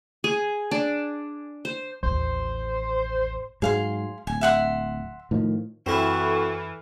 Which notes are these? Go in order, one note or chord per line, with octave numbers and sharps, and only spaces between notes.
G#4
D4
C5
A1 D#2 C5
G#2 F#3 G#4 F5 C6
D1 G#5
E5 F#5 C6
A2 D#3 F3
F#2 E3 C4 E4 F#4 A4 F6